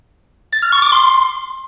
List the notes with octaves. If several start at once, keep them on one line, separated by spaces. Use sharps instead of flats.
A6
F6
C#6
D6
C6